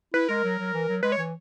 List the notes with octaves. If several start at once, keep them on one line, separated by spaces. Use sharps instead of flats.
E4 B4
G#3 A#4
F#3
F#3
E3
F#3
G#3 B4
C#5
E3